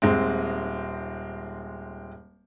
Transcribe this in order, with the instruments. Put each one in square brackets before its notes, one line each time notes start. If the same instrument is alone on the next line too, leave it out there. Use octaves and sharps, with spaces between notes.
[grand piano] D#1 G#3 C4